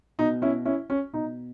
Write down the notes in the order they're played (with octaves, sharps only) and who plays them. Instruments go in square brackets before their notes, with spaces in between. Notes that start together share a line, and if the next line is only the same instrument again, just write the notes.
[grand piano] B2 D#4
C#4 E4
C#4 E4
C#4
B2 D#4